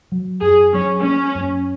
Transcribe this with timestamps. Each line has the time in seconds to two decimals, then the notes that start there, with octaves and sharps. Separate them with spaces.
0.12 F#3
0.42 F#2 G#4
0.73 F#3 C#4
1.03 A#3 C#4
1.35 F#2